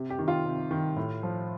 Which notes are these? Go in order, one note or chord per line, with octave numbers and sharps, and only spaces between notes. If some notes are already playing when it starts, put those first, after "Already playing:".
Already playing: C3
G4
D#3
F4
C3
D#3
A2
F3